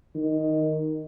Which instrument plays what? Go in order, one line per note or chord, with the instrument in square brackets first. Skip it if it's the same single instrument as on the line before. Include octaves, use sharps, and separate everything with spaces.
[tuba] D#3